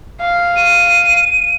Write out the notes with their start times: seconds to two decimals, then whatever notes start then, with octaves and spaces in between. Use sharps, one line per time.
0.21 F5
0.56 D#7